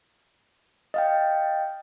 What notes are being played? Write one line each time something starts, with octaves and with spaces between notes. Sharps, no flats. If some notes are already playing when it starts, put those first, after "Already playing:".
D#5 F5 G5